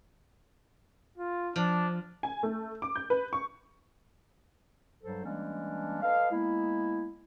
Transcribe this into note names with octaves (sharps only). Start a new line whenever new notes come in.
F4
F3 D4
G#5
A3
D6
G6
B4
C#6
G2 F#3 G3 A4 C5
E3 G3 G#3 A#3 C#4 D4
A4 B4 D#5 F5
G#3 A#3 B3 E4